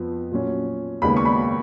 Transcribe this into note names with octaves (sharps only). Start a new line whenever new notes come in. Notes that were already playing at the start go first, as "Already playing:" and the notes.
Already playing: F2 F3 B3
A#2 F#3 C#4
D#2 C#3 G#3 B3 B5
C#6
B5